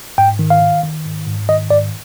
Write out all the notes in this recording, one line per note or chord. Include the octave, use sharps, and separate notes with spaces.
G#2 G5
D#3
F5
D#3
D#3
G#2
G#2
D#3 D#5
G#2 D5